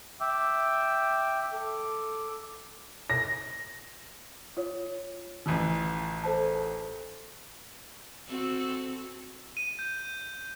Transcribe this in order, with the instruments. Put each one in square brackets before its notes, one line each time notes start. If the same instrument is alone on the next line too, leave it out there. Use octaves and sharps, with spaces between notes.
[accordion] E5 G5 D6 E6
A4 D6
[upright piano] A#6
[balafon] F4 C#5
[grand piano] A1 E3 F3
[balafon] A4 C5 A5
[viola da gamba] C4 F#4 A4
[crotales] D#7
G6